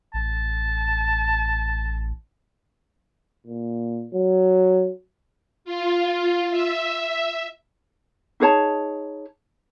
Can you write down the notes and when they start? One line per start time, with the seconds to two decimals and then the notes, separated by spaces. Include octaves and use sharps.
0.14 A1 A5
3.47 A#2
4.14 F#3
5.65 F4
6.50 E5
8.40 D#4 G#4 C#5 A5